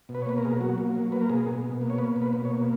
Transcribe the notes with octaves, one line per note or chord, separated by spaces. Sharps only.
B2
B4
C#5
A#3 B4
A#4
B2 G#4
A#4
F#3 F#4
A#3
F#3
A#3 B4
A#4
B2 G#4
B2
B2
A#3
C#5
A#3 B4
B2
B4
B2
C#5
A#3